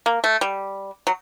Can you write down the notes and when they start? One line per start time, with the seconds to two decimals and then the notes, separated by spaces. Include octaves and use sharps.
0.06 A#3
0.24 A3
0.41 G3
1.07 F#3